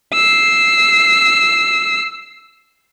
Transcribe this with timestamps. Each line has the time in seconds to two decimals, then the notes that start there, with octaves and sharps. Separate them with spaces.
0.13 E6 C7